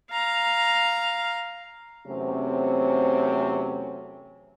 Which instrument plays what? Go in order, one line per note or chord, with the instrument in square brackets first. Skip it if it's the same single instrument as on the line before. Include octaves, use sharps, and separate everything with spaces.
[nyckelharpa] F5 A#5
[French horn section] E2 C3 F#3 A3 C4 C#4